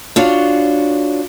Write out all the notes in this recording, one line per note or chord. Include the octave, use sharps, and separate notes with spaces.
D4 F4 F#4 C#5